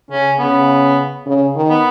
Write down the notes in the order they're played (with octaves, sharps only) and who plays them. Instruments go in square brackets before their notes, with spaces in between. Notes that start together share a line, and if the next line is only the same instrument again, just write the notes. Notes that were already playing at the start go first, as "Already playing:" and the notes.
[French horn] C#3 [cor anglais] C#4
[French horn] C#3 [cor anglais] B3
[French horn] C#3
D#3
[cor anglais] B3